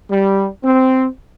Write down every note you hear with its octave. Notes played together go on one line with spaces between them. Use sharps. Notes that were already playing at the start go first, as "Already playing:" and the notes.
G3
C4